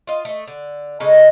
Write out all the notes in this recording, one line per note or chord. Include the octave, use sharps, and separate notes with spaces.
F4 D#5
A3 D#5
D3
C#3 G#3 D#4 A4